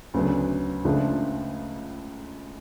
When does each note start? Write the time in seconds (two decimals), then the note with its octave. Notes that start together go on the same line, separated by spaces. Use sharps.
0.14 D2 C#3 F#3 B3 D4
0.84 C#2 C#3 F3 A3 D4